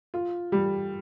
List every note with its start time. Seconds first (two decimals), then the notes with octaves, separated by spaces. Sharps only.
0.14 F4
0.52 G3